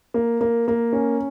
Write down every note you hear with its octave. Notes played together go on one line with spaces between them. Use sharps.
A#3
A#3
A#3
C#4